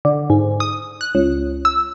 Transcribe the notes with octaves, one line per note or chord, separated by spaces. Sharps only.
D3
G#2
D#6
F#6
C#2
E6